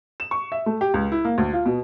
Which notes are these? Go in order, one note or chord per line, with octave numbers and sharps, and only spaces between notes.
E7
C#6
E5
A3
G4
C#2
E4
A#3
D2
F4
B2